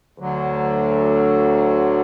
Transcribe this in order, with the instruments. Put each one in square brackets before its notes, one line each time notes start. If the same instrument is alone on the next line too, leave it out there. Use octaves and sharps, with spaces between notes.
[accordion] D2 D3 F#3